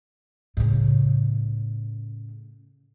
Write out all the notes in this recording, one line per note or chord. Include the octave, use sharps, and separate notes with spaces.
A2 C#3